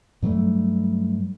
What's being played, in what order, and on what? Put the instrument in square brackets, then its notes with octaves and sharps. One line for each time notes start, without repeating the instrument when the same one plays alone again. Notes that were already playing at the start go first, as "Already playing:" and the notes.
[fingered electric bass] G2 F#3 G3 A3